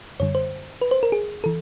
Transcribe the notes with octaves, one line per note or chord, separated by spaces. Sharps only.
F#2 D3 G3 C#5
C5
B4
C5
A#4
G#4
E3 A4